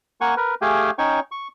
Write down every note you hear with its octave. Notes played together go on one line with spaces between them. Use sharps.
A#3 F#5 G#5 C#6
A#4 B4
A3 G4 G#4 F5 G5 G#5
C#4 D#4 C#5 G5 C#6
C#6